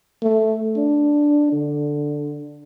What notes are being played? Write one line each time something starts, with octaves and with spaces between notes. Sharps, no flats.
A3
D4
D3